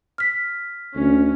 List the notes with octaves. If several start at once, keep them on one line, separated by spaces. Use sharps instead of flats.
F6 B6
D2 C#4